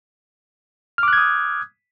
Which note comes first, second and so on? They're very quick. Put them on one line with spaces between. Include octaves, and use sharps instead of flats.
F6 D6 F#6 G#6 D#6